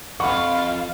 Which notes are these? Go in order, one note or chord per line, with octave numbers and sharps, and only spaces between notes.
F2 F5 F#5 B5 C#6